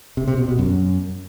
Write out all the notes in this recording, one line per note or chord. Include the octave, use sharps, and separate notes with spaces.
C3
C3
B2
B2
F#2